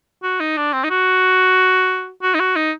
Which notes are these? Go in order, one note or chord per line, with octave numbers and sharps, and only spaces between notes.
F#4
D#4
D4
C4
D#4
F#4
F#4
D#4
F#4
D#4